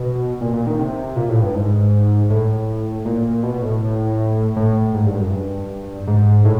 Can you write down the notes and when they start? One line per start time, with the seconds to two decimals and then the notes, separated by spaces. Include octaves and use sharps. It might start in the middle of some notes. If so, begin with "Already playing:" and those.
Already playing: B2
0.41 A#2
0.53 A#2
0.67 D#3
0.79 C3
1.16 A#2
1.29 A2
1.42 G2
1.54 G#2
2.30 A2
3.05 A#2
3.43 B2
3.62 A2
4.56 A2
4.94 G#2
5.06 G2
5.19 F#2
5.31 G2
6.07 G#2
6.45 A2